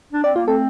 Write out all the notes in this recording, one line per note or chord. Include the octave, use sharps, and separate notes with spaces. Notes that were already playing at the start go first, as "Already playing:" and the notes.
D4
C4 D5
A#3 F4
A3 C4 A4